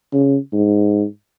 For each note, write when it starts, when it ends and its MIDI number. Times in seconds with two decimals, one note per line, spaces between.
0.13 0.37 49
0.53 1.05 44